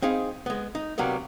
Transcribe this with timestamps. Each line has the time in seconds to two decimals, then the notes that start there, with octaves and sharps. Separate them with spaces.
0.02 C4 D#4 G#4 F5 B5
0.46 G#3 B3
0.75 D#4
0.98 C3 F#3 G3 A#3 B3